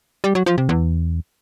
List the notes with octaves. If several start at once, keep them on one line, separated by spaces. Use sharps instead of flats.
G3
F#3
F3
C3
E2